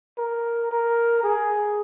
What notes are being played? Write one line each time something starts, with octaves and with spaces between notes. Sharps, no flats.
A#4
A#4
G#4